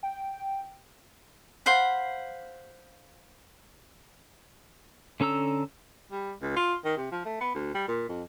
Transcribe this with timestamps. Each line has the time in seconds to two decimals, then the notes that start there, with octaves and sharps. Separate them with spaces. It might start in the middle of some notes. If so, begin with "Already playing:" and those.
0.03 G5
1.66 C5 F5 F#5 B5
5.20 D3 C#4 A4 A#5 E6
6.12 G3
6.41 C#2
6.56 F4
6.85 D#3
6.97 C3
7.12 F3
7.25 A3
7.41 B3
7.55 D2
7.75 G3
7.88 A#2
8.09 F2